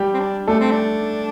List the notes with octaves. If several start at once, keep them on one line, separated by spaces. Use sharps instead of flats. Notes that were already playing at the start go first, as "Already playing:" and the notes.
Already playing: G3 G4
C4
D4
A3 D4 A4
C4
D4